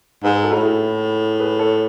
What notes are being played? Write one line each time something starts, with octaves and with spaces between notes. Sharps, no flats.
G#2 G#4 B4
G#4
F#4 A4
A2
E4 G#4
G#4 B4
A4 C#5